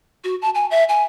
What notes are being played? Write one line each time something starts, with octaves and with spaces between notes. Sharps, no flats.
F#4
A5
G#5
E5
G#5